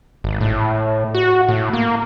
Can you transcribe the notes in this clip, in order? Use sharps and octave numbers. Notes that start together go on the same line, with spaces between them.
G#1
A2
F#4
A2
A#3